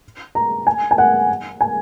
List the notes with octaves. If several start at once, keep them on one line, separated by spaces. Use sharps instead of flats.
A#5
G#5
G#5
F#5
G#5